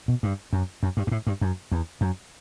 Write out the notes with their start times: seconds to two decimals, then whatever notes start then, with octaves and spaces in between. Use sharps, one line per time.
0.08 B2
0.23 G2
0.53 F#2
0.83 F#2
0.97 G2
1.07 G2
1.11 A2
1.27 G2
1.41 F#2
1.72 E2
2.01 F#2